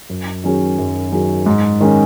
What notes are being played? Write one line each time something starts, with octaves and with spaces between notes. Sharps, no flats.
F#2
D#3 F#3 C#4 G#4
F#2
D#3 F#3 C#4 G#4
G#2
D#3 G#3 C#4